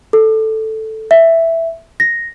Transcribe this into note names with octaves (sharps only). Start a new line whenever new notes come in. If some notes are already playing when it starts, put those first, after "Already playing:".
A4
E5
A#6